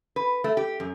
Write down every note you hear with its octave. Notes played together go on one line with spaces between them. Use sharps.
B4
A3
G4
F#2